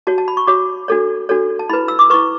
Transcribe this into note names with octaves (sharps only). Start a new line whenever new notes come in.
F#4 C#5 A5
A5
B5
C#6
F#4 C#5 D6
D4 F#4 A4 C#5
D4 F#4 A4 C#5
A5
E4 B4 B5
E6
D6
E4 B4 C#6